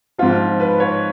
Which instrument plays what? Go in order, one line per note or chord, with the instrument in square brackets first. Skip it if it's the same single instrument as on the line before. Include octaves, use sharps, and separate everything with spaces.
[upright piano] G#2 F3 F4
B4
C#5